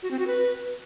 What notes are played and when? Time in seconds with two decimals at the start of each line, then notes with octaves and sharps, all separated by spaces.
0.03 F#4
0.11 C4
0.19 F#4
0.27 B4